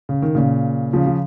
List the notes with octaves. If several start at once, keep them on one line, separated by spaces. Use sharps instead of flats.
C#3
D#3
A#2 C#3
C#3 F3
F3